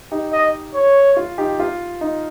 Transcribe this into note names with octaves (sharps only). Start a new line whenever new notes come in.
D#4 G4
D#5
C#5
F4
D#4 G4
F4
D#4